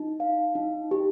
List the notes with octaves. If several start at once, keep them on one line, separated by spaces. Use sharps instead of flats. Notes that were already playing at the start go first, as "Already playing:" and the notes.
Already playing: D#4
F5
D#4
G4